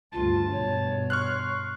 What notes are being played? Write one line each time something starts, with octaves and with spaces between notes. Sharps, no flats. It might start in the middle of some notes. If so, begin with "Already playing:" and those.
D2 G2 F4 A5
G2 B2 C#5
C6 C#6 F6 F#6